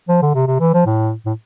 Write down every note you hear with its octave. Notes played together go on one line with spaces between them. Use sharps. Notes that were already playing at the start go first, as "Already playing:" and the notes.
F3
D3
C3
C3
E3
F3
A2
A2